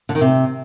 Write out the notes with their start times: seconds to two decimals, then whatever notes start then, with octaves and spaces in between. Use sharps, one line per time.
0.09 D3
0.15 D#3
0.21 C3